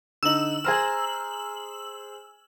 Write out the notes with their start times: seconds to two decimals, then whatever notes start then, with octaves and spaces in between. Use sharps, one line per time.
0.23 D3 D#4 E6 F#7
0.65 G#4 C5 G#5 A#5 F6 E7